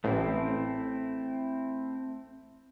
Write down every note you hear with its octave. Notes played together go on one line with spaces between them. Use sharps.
A1 A3 C4 E4